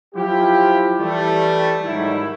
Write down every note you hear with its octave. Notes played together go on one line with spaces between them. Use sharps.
F3 F#3 E4 F4 G4
E3 G3 A3
G#2 D#3 F#3 G3 E4